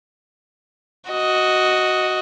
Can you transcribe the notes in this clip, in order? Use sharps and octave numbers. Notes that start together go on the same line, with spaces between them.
F#4 D#5